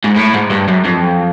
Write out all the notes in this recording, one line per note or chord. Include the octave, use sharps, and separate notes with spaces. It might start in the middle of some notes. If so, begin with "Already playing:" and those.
G#2
A2
G#2
G2
F#2
F2